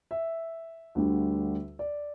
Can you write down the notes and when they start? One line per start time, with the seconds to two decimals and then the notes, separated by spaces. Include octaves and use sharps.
0.11 E5
0.95 D2 D3 G3
1.79 D5